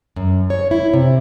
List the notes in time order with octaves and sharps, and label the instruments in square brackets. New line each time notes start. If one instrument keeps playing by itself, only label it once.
[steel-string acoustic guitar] F#2
C#5
E4
C3